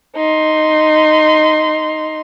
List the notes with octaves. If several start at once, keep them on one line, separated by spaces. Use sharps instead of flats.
D#4 C6